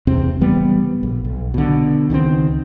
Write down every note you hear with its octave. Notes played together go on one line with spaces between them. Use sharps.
E2 C3 C4
F#1 E3 G3 B3
A#1
B1
B2 D3
C#2 D#3 F3 C4